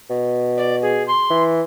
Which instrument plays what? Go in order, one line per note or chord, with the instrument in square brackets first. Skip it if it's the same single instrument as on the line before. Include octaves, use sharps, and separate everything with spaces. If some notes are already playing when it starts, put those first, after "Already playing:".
[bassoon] B2
[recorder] D5
G#4
C6
[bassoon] E3